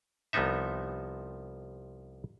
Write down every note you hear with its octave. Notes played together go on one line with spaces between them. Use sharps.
C2 C3 F3 B3 D#4 E5